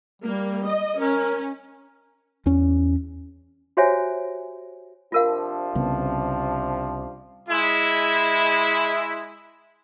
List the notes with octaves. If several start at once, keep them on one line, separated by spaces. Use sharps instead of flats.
G3 A#3
D#5
C#4 A#4
E2 C#4
F#4 G4 C5 C#5 E5 G#5
C3 F3 D4 F4 A#4 F5
C2 C#3 B3
G#3 E4